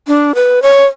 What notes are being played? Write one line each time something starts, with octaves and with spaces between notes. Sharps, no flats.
D4
B4
C#5